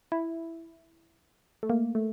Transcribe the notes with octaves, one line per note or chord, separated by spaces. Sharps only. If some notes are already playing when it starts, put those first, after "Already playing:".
E4
A3
A#3
A3